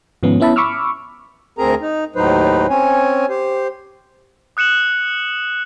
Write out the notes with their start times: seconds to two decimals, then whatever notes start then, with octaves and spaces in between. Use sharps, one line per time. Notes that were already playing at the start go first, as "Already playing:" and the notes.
0.23 G#2 D#3 F3 B3 C#4
0.40 B3 C#4 E4 E5 A5 B5
0.56 B5 C#6 D6 E6 F6
1.58 D2 C4 G#4 A#4 A#5
1.81 D#4
2.16 D#2 A2 F#3 D#4 B4 C5
2.69 C4 C#4 C#5 G#5
3.30 G4 C5
4.57 D#6 F#6 C#7 E7 F#7